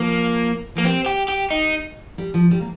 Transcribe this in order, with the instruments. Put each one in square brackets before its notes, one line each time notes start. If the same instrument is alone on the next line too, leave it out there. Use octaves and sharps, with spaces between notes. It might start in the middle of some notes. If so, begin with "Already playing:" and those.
Already playing: [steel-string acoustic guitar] F3 [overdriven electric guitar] A#3
[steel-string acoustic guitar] F3 [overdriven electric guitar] A#3
[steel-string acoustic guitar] G3 [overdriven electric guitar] C4
[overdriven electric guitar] G4
G4
D#4
[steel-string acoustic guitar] G3
F3
G3
A#3